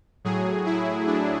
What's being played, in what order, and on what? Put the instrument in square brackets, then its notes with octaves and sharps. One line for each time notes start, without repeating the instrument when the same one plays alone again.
[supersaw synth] A2 F#3 G#4
E4
D4